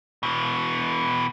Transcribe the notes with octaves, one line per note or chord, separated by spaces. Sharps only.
B2 E3